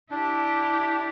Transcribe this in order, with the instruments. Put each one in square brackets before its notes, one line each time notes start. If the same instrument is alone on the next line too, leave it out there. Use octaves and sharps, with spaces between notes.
[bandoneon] D4 [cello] E4 G4